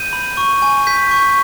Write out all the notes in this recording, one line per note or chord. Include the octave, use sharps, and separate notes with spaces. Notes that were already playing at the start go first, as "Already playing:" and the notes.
Already playing: G6 D#7
B5
C#6
G#5
G6 B6
C#6